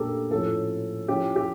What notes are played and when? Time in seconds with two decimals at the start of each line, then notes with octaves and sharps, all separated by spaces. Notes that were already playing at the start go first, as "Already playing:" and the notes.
Already playing: A#2 A3 D4 G4 A4 A#4
0.31 A2 F3 C#4 E4 A4
1.08 F3 C#4 E4 G4
1.36 G4